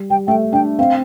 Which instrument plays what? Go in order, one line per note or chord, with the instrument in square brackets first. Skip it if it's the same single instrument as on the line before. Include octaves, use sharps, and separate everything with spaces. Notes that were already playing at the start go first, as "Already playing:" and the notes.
Already playing: [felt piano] G3
[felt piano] G3 [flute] G5
[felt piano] A3 [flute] G5
[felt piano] D4 [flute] G5
[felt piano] C4 [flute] F5